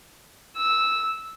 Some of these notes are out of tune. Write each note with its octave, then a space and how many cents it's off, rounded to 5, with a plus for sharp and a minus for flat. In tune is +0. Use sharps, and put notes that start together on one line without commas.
E6 -10